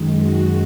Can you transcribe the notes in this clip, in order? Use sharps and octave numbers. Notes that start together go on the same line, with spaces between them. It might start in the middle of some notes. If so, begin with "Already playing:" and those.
Already playing: F#2 D#3 G#3
F#4